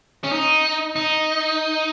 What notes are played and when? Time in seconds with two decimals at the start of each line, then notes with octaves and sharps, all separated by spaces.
0.24 C#4
0.32 D#4
0.96 D#4